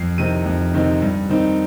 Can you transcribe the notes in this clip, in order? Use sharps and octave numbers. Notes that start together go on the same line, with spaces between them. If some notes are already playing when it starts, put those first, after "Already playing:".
Already playing: F2 C7
C3 D#3 C4 D#4 D#7
F2
C3 D#3 C4 D#4
G2
D#3 C4 D#4